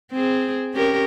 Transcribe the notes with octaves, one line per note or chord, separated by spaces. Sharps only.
C4 G#4
C#4 G4 A#4